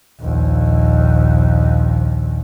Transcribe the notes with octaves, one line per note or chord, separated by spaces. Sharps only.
A#1 D#2